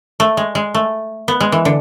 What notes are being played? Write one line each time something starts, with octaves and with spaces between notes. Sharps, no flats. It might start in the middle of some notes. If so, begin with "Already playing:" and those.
A3
G#3
G#3
A3
B3
G#3
E3
D3